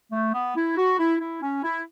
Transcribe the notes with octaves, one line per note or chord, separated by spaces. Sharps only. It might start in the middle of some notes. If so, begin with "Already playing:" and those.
A3
B3
E4
F#4
E4
E4
C#4
E4